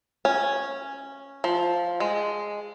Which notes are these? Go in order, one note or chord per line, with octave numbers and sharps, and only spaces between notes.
C#4
F3
G#3